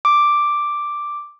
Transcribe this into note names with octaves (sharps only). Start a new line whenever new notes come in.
D6